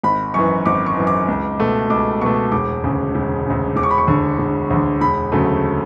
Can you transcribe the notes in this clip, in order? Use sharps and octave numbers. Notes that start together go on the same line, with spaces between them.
G#1 B5
F#2 E3 C#6
G#1 D6
C#6
F#2 E3
D6
C#2
B2 A3
C#2 D6
B2 A3 C#6
E1 D6
D2 C#3
E1
D2 C#3
E1 D6
C#6
B5
C#6
D2 D3
E1
D2 D3
E1 B5
D2 C#3 F#3 A3